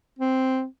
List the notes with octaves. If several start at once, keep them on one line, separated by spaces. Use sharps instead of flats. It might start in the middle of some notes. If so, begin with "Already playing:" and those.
C4